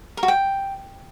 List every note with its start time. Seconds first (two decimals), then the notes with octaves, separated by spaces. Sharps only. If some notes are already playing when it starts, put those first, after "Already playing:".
0.17 A#4
0.23 F#4
0.28 G5